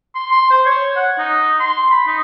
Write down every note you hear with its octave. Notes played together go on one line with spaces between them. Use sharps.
C6
C6
C5
C#5
F#5
D#4
C6
B5
D#4